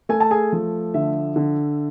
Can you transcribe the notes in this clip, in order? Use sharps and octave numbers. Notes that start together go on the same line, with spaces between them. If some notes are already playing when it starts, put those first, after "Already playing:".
A3 G#5
A5
G#4 G#5
F3
D3 E5
D3